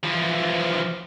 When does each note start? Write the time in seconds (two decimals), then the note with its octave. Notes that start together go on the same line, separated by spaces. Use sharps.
0.03 E3 F3